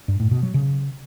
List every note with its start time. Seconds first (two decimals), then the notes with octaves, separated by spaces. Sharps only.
0.08 G2
0.20 A2
0.31 B2
0.43 F#3
0.54 C#3